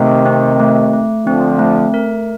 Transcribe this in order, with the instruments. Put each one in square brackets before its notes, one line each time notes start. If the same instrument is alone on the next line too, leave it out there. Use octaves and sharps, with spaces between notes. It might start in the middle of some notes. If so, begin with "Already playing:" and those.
Already playing: [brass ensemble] C3 D#3 [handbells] A3
[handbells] C4
A3
A3
[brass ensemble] D3 F3 [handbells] C4
[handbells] A3
A#4